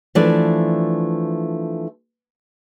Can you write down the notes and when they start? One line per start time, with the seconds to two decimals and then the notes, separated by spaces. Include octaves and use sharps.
0.15 E3 F3 A3 D4 D5